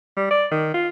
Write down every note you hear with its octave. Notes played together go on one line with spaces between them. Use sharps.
G3
D5
D#3
F4